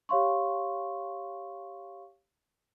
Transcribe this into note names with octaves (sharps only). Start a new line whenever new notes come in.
G4 C#5 F5 C6 C#6